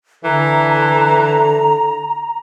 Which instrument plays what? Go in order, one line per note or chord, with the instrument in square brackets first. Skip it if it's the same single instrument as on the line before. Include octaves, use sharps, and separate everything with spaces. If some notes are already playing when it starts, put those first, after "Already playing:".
[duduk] D3 [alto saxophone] E3 [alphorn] A4 [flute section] A#5